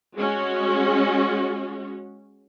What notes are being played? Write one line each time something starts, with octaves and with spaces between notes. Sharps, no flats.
G#3 C#4 F#4